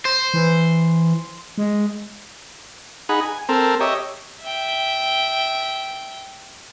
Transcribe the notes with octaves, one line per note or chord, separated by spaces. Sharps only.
C5
E3
G#3
D#4 G#4 F#5 B5
G#5
C4 A4 A#4
G4 C#5 D#5 E5
E5 G5